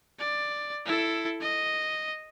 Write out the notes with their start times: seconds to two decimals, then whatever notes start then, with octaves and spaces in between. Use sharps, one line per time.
0.19 D5
0.86 E4 A4
1.41 D#5